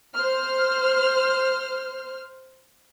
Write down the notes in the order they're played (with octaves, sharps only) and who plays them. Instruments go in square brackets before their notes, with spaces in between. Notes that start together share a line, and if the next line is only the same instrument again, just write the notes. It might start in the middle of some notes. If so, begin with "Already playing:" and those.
[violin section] C5 F6